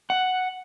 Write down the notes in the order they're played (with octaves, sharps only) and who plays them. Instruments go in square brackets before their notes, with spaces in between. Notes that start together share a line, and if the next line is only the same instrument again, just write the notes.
[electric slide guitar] F#5